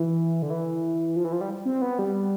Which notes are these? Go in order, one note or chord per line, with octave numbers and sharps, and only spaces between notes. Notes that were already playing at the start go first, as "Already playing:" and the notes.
Already playing: E3
D3
E3
F3
E3
F3
G3
C4
B3
G3